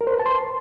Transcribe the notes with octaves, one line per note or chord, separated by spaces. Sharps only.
A#4
C5
B4
A5
C6